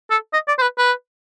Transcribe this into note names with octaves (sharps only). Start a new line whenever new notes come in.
A4
D#5
D5
C5
B4
B4